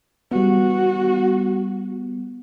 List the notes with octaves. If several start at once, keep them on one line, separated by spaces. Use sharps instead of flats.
G3 B3 F#4